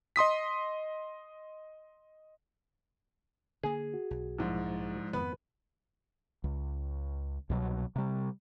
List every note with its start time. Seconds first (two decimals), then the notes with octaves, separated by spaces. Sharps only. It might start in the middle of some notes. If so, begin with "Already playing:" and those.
0.16 D#5 C6 D#6 B6
3.63 D3 A#3 G#4
3.94 F#4
4.11 B1
4.38 A#1 G#2 F3 G#3 E4
5.13 F2 G#2 D#3 B3 B4
6.44 C#2
7.50 C2 B2 F#3
7.96 C3 G3